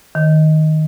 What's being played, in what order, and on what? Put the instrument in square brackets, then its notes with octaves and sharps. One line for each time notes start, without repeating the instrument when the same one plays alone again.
[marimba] D#3